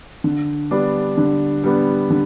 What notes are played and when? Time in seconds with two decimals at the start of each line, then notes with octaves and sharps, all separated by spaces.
0.24 D3
0.71 G3 B3 D4
1.17 D3
1.64 G3 B3 D4
2.10 D3